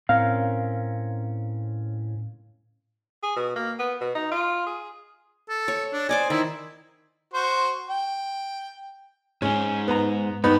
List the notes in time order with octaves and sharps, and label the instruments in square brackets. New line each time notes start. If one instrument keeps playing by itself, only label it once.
[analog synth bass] A2 [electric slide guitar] C4 C#4 A#4 [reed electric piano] F5
[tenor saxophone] G#4
B2
A#3
B3
B2
D#4
F4
G#4
[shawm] A4
[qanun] C#5
[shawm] D4
[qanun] C5 D5 D#5 [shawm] G#5
[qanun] D#3 [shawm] E4
[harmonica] F#4 C5
G5
[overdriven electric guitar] G#2 G#3 [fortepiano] C#4
[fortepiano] B3 A#5
[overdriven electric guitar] G2 [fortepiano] B3 D#4 B5